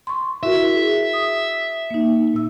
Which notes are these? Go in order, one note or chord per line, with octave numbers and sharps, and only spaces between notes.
C6 C#6
E4 F#4 A#4 E5
G#4
D#6
A#3 D#4
A#2 E6